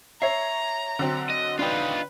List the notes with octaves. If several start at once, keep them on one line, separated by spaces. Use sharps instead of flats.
C#5 E5 A#5 C7
D3 F#3 C4
D#5
D4 D#4 F4 B4 D5 G5